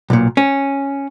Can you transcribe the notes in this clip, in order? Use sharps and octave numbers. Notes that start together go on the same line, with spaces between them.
B1 A#2
C#4